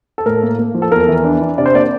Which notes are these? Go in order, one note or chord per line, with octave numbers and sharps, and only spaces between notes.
A4
A2 A#4
A#3
A#3
F3
A4
E2 A#4
E3
D4
D4
C3 D5
C5
A#3 D5